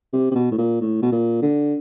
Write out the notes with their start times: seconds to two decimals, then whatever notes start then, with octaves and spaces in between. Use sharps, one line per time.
0.13 C3
0.31 C3
0.35 B2
0.51 A2
0.58 A#2
0.81 A2
1.02 B2
1.12 A#2
1.42 D3